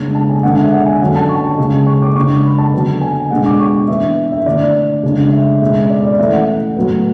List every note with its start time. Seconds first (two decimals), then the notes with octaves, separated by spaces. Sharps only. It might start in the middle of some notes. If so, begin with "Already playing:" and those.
Already playing: C#3 G#3 B3 D4
0.15 A5
0.29 G#5
0.43 D3 G#3 B3 D4 F#5
0.58 E5
0.71 F#5
0.86 G#5
1.01 D3 F#3 C#4 F#5
1.16 A5
1.29 C#6
1.44 A5
1.58 C#3 G#3 C#4
1.87 C#6
2.02 D6
2.16 C#3 G#3 D4 C#6
2.44 B5
2.58 A5
2.74 D3 F#3 B3
3.01 G#5
3.31 B2 G#3 D4 F#5
3.46 D6
3.60 C#6
3.88 E3 B3 D4 E5
4.32 E5
4.46 D3 A3 D4 D5
5.03 C#3 G#3 D4
5.32 E5
5.62 B2 G#3 C#4 E5
5.90 D5
6.04 D5
6.18 E3 A3 C#4 E5
6.33 F#5
6.77 A2 F#3 B3